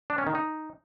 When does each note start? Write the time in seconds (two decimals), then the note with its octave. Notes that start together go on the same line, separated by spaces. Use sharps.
0.10 D4
0.18 C#4
0.27 D#3
0.35 D#4